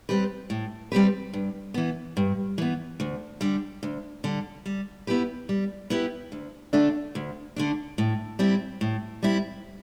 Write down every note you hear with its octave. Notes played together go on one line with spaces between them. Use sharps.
G3 C4 G4 B4
A2
G3 C4 G4 B4
G2
E3 B3
G2
E3 B3
D2
D3 G3
D2
D3 G3
G3
B3 E4 G4 B4
G3
B3 E4 G4 B4
D2
D3 A3 D4
D2
D3 A3 D4
A2
G3 C4 E4
A2
G3 C4 E4